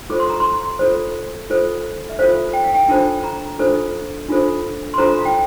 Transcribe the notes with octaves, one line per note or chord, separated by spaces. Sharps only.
F4 A4 C5 D6
C6
A#5
C6
F4 A4 C5
F4 A4 C5
E5
F4 A4 C5 F5
G5
F5
G5
D4 F4 A4 C5 A5
A#5
D4 F4 A4 C5
D4 F4 A4 C5
C6
D4 F4 A4 C5 A#5
F5
G5